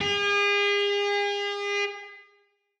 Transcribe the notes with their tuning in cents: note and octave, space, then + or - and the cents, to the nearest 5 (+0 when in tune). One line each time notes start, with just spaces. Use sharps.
G#4 -40